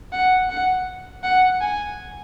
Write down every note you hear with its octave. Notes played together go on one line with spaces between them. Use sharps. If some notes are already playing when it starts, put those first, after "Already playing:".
F#5
F#5
F#5
G#5